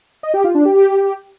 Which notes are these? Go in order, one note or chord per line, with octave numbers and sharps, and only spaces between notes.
D#5
G4
F4
D4
G4